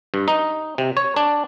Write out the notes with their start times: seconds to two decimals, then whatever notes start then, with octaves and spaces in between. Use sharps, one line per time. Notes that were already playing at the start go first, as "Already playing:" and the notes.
0.14 G2
0.28 D#4
0.78 C3
0.97 C#5
1.16 D4